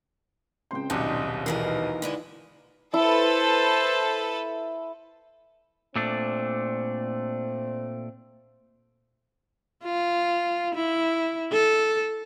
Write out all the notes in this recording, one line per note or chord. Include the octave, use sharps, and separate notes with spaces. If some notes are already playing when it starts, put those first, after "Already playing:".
C#2 C4 C5 G5 C6
D#1 B1 G#2 D4 D#5 F#5
E2 B2 D#3 E3 F4 A#4 C7
D3 E3 G#3
E4 A4 B4 C5
A#2 A3 C4 D4
F4
E4
A4